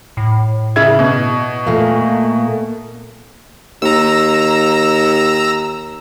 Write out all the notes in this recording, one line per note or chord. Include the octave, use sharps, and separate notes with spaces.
A2
C#3 E4 G#6
B2
A#2 A3 A#3
D#2 A#5 E6